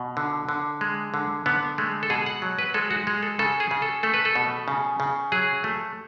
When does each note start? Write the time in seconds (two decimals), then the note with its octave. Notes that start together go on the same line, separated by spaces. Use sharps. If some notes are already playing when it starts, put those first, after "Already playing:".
Already playing: B2
0.17 D3
0.49 D3
0.81 G#3
1.14 D3
1.46 D3 B3
1.78 G#3 A3
2.03 A4
2.10 B2 G#4
2.26 F#5
2.42 F#3
2.59 B4
2.74 G#3 A4
2.91 F#4
3.07 G#3
3.23 A4
3.39 C#3 A4
3.60 G#4
3.71 C#3
3.82 A4
4.03 A3 A4
4.14 B4
4.25 A4
4.36 B2
4.68 C#3
5.00 C#3
5.32 F#3 G#4
5.64 A3